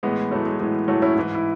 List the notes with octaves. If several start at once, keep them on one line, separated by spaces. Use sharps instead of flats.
A2 E3 G#3 B3
A2 E3 F#3 A3
G#3
A2 E3 G#3
A2 E3 F#3 A3
C#4 E4
G#2 E3
E4